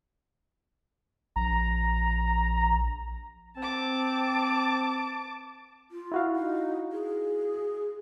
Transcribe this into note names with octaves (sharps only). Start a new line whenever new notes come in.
A#1 A#5
C4 A5 D6
F4
E4 F#4 F5
D#4
G#4